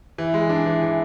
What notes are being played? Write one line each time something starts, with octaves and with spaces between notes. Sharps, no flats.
E3
G#3
D4
E3
E3